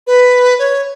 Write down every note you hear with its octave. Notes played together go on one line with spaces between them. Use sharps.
B4
C#5